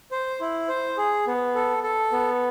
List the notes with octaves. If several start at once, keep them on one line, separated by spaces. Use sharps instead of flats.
C5
E4
C5
G#4
B3
A4
A4
B3